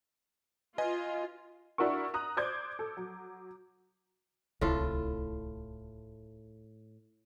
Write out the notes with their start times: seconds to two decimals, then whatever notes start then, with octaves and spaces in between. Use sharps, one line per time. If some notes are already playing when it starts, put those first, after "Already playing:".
0.78 F4 B4 D#5 G#5
1.78 D4 E4 F#4 A#4 C#6
2.14 A#5 D#6 F#6
2.37 C5 D5 D6 G6 G#6
2.79 A4
2.97 F#3
4.61 D1 C2 A2 F4 A4